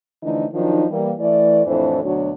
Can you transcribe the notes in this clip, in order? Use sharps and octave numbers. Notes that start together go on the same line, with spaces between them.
D3 E3 F3 A3 D#4
D#3 F3 F#3 D4 D#4
E3 G3 A#3
E3 A3 D5
F2 A2 E3 D4 E4 C5
D2 B2 F#3 D4 F#4 C#5